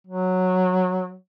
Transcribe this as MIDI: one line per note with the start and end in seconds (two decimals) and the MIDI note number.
0.07 1.15 54